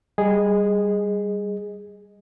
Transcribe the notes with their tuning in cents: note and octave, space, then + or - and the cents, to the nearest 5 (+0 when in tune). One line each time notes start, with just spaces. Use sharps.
G3 +0 G#4 -5 D#5 +0